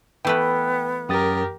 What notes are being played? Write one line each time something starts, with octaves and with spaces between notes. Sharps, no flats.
E3 A3 B3 B4 G5
F#2 G4 A#4 D#6 A6